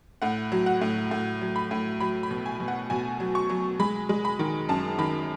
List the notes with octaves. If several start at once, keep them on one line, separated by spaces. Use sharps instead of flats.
A2 F#5
F#3
F#5
A2
A2
F#3
B5
A2
F#3 B5
B5
B2
G#5
B2
F#5
B2 G#5
F#3
C#6
F#3
G#3 B5
G#3
B5
D#3
F#2 A5
D#3 B5